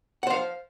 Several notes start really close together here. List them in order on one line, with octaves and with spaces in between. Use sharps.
F#5 C5 F5